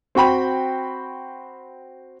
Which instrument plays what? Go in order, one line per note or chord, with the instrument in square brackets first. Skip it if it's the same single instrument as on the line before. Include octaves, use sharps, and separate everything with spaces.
[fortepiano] C4 F#4 G5 B5